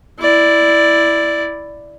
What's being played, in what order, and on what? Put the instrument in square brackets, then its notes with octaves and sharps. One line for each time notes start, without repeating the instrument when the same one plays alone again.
[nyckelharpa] E4 D5